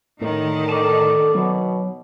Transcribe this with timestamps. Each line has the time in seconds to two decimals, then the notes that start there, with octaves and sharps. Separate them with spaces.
0.21 A2 D3 D#3
0.69 A4 D5 A5
1.35 B2 F#3